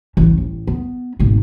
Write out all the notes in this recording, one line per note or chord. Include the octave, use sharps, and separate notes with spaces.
A1 E3
A1
B3
G#1 B2